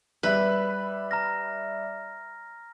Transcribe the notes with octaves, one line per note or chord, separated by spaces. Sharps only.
G3 B4 E5 F#6
A#5 F6 A#6